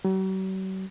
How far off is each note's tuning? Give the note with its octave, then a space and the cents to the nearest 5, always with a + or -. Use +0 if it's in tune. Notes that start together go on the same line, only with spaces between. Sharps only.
F#3 +45